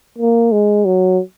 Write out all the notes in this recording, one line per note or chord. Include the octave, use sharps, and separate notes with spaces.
A#3
G#3
F#3